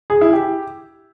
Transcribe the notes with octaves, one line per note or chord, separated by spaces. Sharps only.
G#4
E4
G4